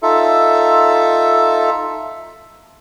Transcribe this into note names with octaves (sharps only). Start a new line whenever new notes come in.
D#4 F4 A4 E5